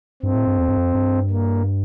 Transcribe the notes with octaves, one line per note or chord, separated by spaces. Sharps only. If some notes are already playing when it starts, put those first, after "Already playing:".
G2 C4
A2
G2
E2
G2
F2
G2
A#3